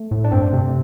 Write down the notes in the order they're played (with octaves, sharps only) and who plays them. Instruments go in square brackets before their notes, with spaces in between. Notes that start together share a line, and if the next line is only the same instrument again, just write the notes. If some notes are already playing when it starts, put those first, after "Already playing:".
Already playing: [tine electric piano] A3
[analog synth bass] A2
[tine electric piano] D4
[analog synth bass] G2 [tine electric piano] C4
[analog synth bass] C3